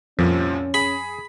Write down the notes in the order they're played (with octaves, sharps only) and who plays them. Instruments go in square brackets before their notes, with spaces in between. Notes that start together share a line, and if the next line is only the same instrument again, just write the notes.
[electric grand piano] C2 A#2 F3 [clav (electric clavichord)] F2 [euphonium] C#4
[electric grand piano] G#4 [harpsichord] B5